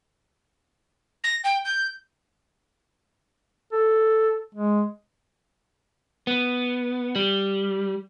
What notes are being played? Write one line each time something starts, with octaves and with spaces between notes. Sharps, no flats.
A#6
G5
G6
A4
G#3
B3
G3